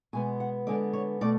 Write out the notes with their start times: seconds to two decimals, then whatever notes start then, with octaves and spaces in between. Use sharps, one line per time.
0.13 B2 G#3 B3 G#5
0.40 F#5
0.67 D3 G#3 B3 D5
0.93 C#5
1.21 B2 A3 D5